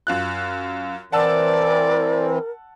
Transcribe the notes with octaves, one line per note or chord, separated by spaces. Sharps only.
F#2 F4 F#6
E3 C4 A#4 D5 F#5 A5 E6